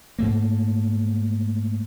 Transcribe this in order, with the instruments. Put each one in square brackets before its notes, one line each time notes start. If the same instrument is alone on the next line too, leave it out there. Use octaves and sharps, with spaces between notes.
[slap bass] G#2 A3 A#3